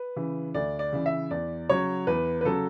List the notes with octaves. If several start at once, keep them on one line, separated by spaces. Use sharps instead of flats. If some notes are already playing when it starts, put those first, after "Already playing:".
Already playing: B4
C#3 E3
D2 D5
D5
C#3 E3
E5
E2 D5
C#3 F#3 C#5
E2 B4
B4
C#3 F#3 A4